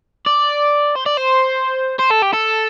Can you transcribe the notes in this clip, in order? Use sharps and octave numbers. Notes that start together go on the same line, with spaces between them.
D5
C5
D5
C5
C5
A4
G4
A4